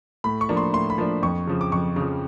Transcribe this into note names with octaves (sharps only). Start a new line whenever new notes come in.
A2 B5
C#6
F3 A#3 D4
C6
A2 C6
B5
F3 A#3 D4
F2 C#6
C#3 F3
D6
F2 C#6
C#3 F3